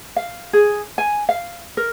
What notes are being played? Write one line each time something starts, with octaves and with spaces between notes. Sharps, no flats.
F5
G#4
G#5
F5
A#4